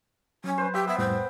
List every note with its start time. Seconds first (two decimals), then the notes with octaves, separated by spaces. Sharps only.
0.44 F#3 C#4
0.58 B4 C5
0.74 G4 E5 G5
0.87 B3 E5
0.98 F2 A2 G3 C5